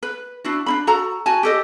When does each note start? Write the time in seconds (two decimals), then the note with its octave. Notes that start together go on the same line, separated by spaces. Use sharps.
0.03 B4
0.44 D4 E4 F#4
0.66 D4 D#4 B5
0.87 F#4 A4 A#5
1.26 F#4 G#5 A5
1.43 G4 A4 D#5